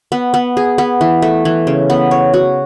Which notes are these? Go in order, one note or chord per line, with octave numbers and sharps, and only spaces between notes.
B3
B3
G#4
B3
E3
A3
E3
C#3
B3
C#5
F#4